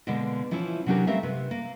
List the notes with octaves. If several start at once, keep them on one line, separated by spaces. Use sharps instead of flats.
B2 D3 G#3 A#3
E3 F3 C#4 E4
C3 F#3 C#4 D4 G4 A#4
G3 A3 C4 A#4 E5 F5
C3 B4
A#3